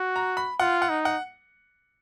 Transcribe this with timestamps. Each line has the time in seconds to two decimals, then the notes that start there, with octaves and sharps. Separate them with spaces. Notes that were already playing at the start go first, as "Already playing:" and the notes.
Already playing: F#4
0.16 A#5
0.37 B5
0.59 F4 F#5
0.82 F#5
0.89 D#4
1.05 F#5